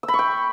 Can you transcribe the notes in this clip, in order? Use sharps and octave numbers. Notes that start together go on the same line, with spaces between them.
E6
B5
C#6
G5